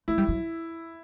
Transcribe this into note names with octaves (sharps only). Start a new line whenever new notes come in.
A3 E4
G3
F#3